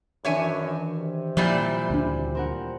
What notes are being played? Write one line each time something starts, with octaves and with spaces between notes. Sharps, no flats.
F#2 D#3 E3 D4 C#5 E5 G#5
C3
A#2 F3 G3 E4 D5
D2 D4
C4 A#4 F#5